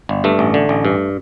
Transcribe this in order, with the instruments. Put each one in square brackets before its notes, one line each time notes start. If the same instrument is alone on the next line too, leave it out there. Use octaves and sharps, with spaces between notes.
[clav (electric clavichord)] G1
G2 A3
A1
D3
A1
G2